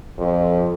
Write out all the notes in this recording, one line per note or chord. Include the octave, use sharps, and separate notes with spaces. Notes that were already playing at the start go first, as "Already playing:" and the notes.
F2